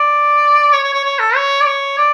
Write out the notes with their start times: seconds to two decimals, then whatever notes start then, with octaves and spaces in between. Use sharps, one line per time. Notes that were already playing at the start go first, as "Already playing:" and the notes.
Already playing: D5
0.73 C#5
0.83 C#5
0.94 C#5
1.04 C#5
1.19 A4
1.35 C#5
1.61 D5
1.66 C#5
1.98 D5